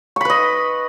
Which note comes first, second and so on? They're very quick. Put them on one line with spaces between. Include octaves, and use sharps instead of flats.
C#6 B5 B4 D#5